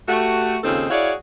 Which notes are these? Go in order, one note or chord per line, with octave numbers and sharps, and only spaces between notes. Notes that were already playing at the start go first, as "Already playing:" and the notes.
A3 F#4 G4
D#2 C#3 C4 D#4 F4 A4
E4 F#4 G#4 C#5 D5 F5